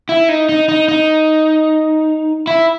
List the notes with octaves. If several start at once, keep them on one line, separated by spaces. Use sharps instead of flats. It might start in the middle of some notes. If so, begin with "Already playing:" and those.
E4
D#4
D#4
D#4
D#4
E4